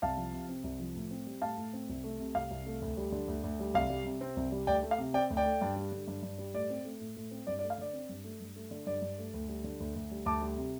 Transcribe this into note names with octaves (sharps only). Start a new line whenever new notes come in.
C2 F5 A5
F3
C3
C4
C2
F3
A2
C4
G3
A2 F5 A5
A2
C4
C2
A3
C3
C2 F5
C2
A3
D2
G3
D3
D2
D2
G3
C2 F5
G3
C3
C4
C2
G3
D2 D5 G5
A3
F5
C3
C4 D5 G5
D2
D5 G5
A3
G2
G3
D3
G2
G2
G3
A2 D5
C4
A3
A2
A2
C4
G2 D5
D5
A3
F5
D3 D5
C4
G2
A3
G2
A3
D3
G2 D5
G2
A3
D2
G3
D3
D2
D2
G3
D2 A5 D6
G3
C3